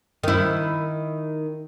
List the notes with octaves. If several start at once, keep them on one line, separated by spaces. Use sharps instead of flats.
D#3 E4